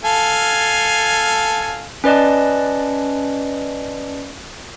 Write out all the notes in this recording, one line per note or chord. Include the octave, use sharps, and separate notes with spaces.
A4 F5 G#5
C#4 B4 D5 D#5 A5